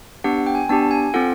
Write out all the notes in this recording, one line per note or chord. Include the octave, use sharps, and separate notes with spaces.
B3 D4 G4 F#5
G5
G#5
B3 D4 G4 A5
G#5
C4 F4 A4 F#5